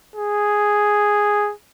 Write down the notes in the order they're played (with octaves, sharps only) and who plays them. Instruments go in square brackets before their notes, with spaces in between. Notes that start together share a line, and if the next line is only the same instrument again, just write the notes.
[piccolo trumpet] G#4